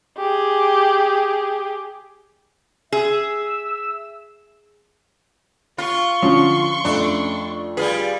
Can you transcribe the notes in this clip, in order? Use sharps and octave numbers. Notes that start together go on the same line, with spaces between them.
G4 G#4
G#4 E5 E6
F4 C6 C#6
D3 F3 C#4
F2 A3 D4
G3 F4 G#4 B4